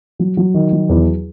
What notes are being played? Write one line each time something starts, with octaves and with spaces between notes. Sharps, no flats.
F#3
F#3
D#3
F#3
E2